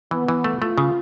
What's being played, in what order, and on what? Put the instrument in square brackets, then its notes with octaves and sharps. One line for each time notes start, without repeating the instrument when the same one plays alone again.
[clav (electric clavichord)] E3 [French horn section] B3
[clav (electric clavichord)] E3
A3
[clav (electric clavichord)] A3 [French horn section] F4
[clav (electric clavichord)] C#3